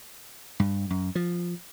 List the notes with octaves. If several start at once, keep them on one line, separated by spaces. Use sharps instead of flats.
G2
F#2
F3